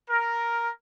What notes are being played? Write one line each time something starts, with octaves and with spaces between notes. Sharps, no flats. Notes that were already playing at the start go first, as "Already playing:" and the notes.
A#4